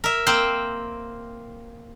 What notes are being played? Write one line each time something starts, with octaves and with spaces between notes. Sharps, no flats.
A#4 E5
A#3 C4 C5 G5